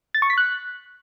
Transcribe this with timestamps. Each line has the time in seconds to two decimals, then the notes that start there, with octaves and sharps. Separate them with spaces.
0.15 A6
0.22 C#6
0.30 B6
0.38 F#6